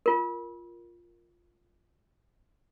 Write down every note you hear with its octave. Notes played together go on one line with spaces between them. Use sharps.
F4 A#4